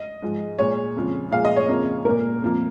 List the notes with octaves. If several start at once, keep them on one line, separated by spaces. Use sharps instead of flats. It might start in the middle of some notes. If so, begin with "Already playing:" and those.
Already playing: D#5
G#2 F3 G#3
A#2 G#3 C#5
F2 C#3 F3 G#3
A#2 F3 G#3 F5
D#5
C#5
F2 C#3 F3 A#3
A#2 A#3 A#4
F2 F3 A#3